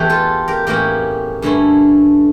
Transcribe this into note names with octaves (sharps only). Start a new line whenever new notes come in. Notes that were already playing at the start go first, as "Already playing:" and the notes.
Already playing: E2 E3 A3 G4
F4 A4
G4 A#4
A2 E3 A#3 C#4 E4 G4 A#4
G2 D3 A3 C#4 E4